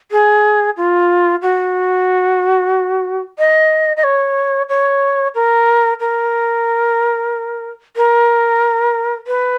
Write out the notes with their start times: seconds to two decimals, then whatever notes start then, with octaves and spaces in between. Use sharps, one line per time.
0.11 G#4
0.77 F4
1.42 F#4
3.39 D#5
3.97 D#5
4.04 C#5
4.69 C#5
5.35 A#4
6.00 A#4
7.96 A#4
9.27 B4